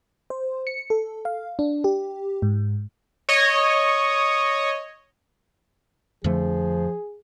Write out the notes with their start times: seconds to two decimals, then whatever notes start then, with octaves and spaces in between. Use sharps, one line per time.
0.30 C5
0.67 C#7
0.90 A4
1.25 F5
1.59 D4
1.84 G4
2.42 G#2
3.29 C#5 D#5
6.24 F2 D3 F3 A3 G#4